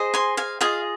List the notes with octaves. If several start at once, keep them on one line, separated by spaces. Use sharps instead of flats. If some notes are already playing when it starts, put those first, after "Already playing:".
Already playing: G#4 C5 D#5
G#5 C6
F5 G#5
F4 G#4 D#5 F5 G#5